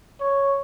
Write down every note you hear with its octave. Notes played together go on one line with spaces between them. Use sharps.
C#5